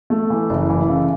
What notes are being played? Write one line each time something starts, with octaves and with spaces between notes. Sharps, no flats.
A3
E3
F#1
E3
C#3